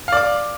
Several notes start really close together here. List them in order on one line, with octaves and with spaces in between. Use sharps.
F5 D5 D6